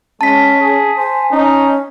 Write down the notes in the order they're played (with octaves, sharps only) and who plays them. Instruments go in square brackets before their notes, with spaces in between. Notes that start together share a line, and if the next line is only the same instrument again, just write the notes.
[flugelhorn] G#3 [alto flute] C#4 [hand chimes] A5 B6
[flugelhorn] G#4
[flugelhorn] C5 [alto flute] G#5
[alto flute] C#4 [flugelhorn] D#4